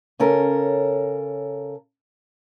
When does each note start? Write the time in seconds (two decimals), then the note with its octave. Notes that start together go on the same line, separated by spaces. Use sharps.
0.20 C#3 C#4 A4 A#4